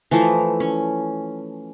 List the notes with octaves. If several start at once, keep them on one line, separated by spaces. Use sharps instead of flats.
E3 F3 A3
C#4